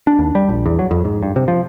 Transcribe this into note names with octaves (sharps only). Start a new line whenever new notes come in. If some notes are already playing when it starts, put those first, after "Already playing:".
D4
D#2
G3
A#1
E2
F#3
F2
G#2
G2
C3
F3